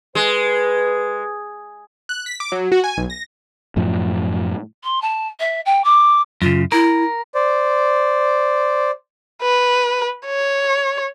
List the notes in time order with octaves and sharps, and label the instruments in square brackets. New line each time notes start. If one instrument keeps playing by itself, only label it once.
[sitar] G#3 [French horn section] B4
[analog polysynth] F#6
B6
D6
F#3
F#4
G#5
B1
A#6
[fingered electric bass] F#2 A2 F3
[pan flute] C6
A5
E5
G5
D6
[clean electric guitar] F#2 C#3 [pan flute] F4
[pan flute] E4 [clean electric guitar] A#4
[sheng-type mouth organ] C5 D5
[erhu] B4
C#5